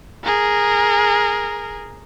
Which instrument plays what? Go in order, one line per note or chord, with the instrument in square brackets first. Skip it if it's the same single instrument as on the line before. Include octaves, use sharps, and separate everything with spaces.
[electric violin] G#4 A#4